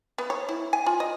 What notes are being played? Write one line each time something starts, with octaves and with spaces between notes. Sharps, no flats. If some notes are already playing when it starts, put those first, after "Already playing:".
B3
C#5
E4
G#5
F4
D#5